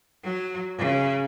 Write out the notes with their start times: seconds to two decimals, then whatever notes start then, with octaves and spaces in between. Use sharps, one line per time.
0.23 F#3
0.78 C#3